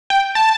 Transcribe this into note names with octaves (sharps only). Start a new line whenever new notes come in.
G5
A5